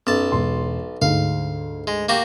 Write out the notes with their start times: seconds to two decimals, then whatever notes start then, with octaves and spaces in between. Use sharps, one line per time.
0.07 B1 F#2 A5
0.32 E1 C6
1.02 D2 G#2 F5
1.87 G#3
2.09 A#3 F#4 G4